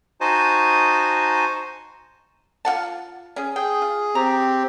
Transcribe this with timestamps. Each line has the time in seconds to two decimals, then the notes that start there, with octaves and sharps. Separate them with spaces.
0.21 D#4 F#4 C5 D#5 G#5 A5
2.65 F4 F#5 A5
3.36 C#4 G#4
3.56 G#4 G5
3.82 F4
4.15 C4 G4 A#5